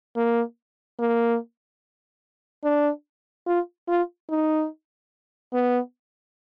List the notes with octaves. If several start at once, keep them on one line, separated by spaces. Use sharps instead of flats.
A#3
A#3
D4
F4
F4
D#4
B3